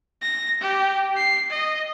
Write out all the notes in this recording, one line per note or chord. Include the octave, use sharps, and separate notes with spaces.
A#6
G4
C7
D#5